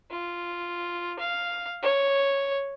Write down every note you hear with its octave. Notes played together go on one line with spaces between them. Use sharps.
F4
F5
C#5